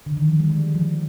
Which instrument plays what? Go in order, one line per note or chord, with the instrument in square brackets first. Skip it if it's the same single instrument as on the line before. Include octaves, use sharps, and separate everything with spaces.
[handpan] D3
D#3
F3
G3
G#3
F3